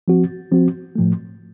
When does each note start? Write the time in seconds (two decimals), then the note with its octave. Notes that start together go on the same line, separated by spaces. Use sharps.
0.08 F3 C4 F#4
0.51 F3 C4 F#4
0.95 A2 F3 A3